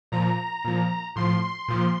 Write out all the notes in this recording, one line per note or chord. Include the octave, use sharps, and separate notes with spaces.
A#2 F3 A#5
A#2 F3
A2 F3 C6
A#2 F3